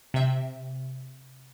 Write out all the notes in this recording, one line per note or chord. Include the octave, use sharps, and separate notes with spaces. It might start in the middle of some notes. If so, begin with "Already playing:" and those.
C3 E5